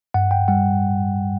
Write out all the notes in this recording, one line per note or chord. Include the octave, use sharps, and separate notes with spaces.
G2 F#5
G5
G3 F#5